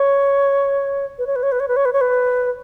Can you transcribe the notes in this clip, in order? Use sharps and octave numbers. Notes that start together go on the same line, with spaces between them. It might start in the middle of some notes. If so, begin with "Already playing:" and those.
Already playing: C#5
B4
C#5
B4
C#5
B4
C#5
B4
C#5
B4
C#5
B4